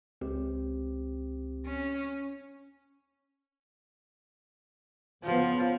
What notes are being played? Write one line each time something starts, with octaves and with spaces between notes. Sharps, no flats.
C#2 C4 G4
C#4
C#3 F3 B3